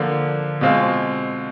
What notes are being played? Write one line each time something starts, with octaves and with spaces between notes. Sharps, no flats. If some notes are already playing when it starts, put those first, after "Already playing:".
Already playing: D3 F3 A#3
B2 G#3 C4 F4